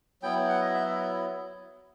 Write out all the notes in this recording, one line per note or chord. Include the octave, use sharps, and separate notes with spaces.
F#3 B3 E4 G5
F#5
D#5
E5